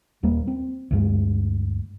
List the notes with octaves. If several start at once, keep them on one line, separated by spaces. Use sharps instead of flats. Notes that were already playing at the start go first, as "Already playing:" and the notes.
D#1 D#2 G3 A#3
C4
D2 G2 G#3